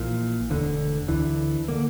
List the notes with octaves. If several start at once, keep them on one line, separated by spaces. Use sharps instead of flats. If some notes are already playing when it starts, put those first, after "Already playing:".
Already playing: A#1 A#2 E3
E1 D2 D3
D2 D3 E3
D3 A#3